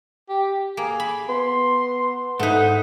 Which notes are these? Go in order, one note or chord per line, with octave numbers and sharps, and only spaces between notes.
G4
A#3 G#4
B5
B3 C6
G#2 A3 D#4 B4 F#5